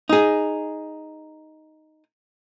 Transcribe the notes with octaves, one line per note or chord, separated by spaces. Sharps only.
D#4 G#4